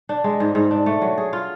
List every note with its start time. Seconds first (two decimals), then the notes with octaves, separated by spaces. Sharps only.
0.09 D4
0.24 G#3
0.40 G#2
0.55 G#2
0.71 D4
0.86 A3
1.02 F#3
1.18 G#4
1.33 F4